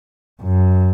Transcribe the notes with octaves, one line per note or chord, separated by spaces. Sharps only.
F#2